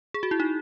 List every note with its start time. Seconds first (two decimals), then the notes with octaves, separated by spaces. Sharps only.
0.14 G#4
0.23 F#4
0.31 E4
0.40 D#4